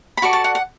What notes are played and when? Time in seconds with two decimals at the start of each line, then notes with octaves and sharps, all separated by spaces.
0.17 B5
0.22 F#4 A4 D5 C#6
0.33 A5
0.44 F#5
0.55 F#5